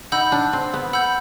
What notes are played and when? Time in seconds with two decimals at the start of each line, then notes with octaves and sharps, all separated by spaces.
0.12 D#4 F#5 B5 E6 G6
0.32 D4
0.53 C4
0.74 B3
0.93 F#5 B5 E6 G6